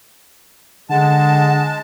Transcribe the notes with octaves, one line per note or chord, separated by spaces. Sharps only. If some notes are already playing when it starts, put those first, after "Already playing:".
D3 G#3 F#5 A5